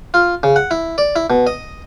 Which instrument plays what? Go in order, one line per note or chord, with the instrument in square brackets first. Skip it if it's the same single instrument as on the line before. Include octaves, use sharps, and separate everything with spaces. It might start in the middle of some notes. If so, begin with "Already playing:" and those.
[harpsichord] F4
C#3
F#5
E4
D5
E4
B2
D#5